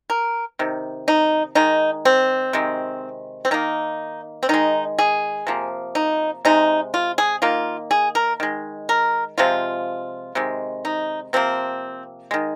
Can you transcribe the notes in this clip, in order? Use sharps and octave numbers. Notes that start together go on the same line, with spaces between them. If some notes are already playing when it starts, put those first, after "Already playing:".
A#4
C3 D#3
D#4
D#3 G#3 D#4
C4
C3 D#3 G#3
C4
D#3 A#3 D#4
C4
D#3 G#3 D#4
G#4
C3 F3 A#3
D#4
C3 G#3 D#4
F4
G#4
D#3 A#3 F4
G#4
A#4
D#3 G#3
A#4
C3 F3 G#3 F4
C3 D#3 G#3
D#4
C3 F3 A#3 C4
D#3 G#3